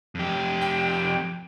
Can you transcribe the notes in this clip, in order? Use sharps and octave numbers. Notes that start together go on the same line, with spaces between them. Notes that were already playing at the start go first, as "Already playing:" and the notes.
F2 G4
G5